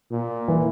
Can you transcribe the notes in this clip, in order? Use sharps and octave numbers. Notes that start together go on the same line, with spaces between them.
A#2
E3